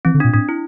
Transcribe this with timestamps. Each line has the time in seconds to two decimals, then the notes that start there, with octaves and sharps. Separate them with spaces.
0.05 E3 C4
0.14 D3
0.20 D4
0.25 A#2
0.34 A2 D4
0.49 E4